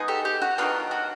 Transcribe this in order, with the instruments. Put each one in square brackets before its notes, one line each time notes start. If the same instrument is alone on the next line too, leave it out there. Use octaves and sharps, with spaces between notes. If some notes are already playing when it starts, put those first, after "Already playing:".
Already playing: [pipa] G#3 B3 D#4 G#4
[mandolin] G4 A4
G4
F#4
[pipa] D#3 F#3 B3 D4 [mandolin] F4
[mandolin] F#4